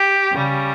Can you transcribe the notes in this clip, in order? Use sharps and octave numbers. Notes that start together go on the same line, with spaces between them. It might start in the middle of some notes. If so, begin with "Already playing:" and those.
Already playing: G4
C#3 G3